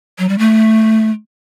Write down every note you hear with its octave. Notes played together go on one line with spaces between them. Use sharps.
F#3
G3
A3